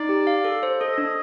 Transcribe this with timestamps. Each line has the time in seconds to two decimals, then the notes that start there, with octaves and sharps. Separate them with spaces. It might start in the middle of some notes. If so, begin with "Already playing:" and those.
Already playing: D#4 D5
0.09 G4
0.27 F5
0.45 A4
0.63 C5
0.80 A4 D#5
0.98 D4